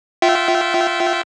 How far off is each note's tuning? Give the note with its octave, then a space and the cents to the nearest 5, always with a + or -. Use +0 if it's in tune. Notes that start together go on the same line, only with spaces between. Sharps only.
F4 +0 E5 +0 G5 -30